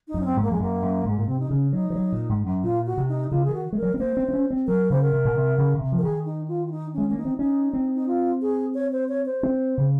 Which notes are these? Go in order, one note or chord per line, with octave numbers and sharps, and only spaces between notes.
D#4
F#2
C#4
C4
G#2
A#3
F2 G#3
F#2 A#3
F#2
G#2 G#3
A#2 A#3
C3 C4
D#4
C#3 C#4
F#3 D#4
F3
F#3
A#2
G#2
F#2
A#2 F4
F#4
C3
D#4
C#3 F4
D#3 G#4
F#4
G#3 A#4
F#3
C4
A#3 C5
C4
C4
C#4
C4
F#3 A#4
C#3 C5
A#4
C3
A#2
C3
C#3
C#3
C3
F3
A#4
D#3 G#4
D#4
F4
F4
D#4
G#3 C#4
A#3 C#4
D#4
C4
C#4 D#4
C4
D#4
F4
G#4
C#5
C5
C#5
C5
C4
C#3